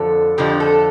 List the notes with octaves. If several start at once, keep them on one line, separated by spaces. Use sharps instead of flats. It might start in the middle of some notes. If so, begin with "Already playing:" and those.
Already playing: F2 D3 F3 A4
F2 D3 F3 G4
A4